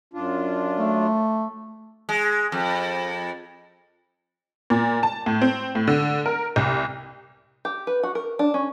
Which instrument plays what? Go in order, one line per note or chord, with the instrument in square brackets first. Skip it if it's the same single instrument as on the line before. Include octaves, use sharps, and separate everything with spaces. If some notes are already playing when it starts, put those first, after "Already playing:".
[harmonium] F#2 D4 F4
[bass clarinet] A3
[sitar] G#3
F2
[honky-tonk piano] A#2
A5
A2
C4
A2
D3
A#4
C2
[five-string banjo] G4
B4
F#4
A#4
D4
C#4